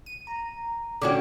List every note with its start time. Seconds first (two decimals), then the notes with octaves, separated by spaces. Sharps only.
0.06 D#7
0.27 A#5
1.02 D3 C#4 F#4 A4 G5 D6